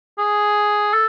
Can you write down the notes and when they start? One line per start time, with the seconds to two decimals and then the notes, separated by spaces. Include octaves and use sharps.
0.18 G#4
0.93 A4